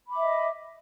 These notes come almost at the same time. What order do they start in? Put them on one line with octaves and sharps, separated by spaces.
B5 D6 E5 D#5